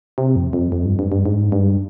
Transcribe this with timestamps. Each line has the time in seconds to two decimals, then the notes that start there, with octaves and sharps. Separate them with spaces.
0.18 C3
0.36 F2
0.53 F2
0.72 F2
0.85 G2
0.99 G2
1.12 G2
1.26 G#2
1.52 G2